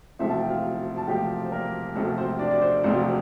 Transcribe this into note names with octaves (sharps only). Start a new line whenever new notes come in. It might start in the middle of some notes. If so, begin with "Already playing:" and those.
E1 D2 C3 F3 C4 E4 E5
A5
G5
F4 F5
A5
E1 D2 C3 F3 C4 G4 G5
C5
A#3 A#4
E1 D2 C3 F3 A3 C4 A4
C4 C5
D4 D5
D5
C4 C5
E1 D2 C3 F3 C4 C5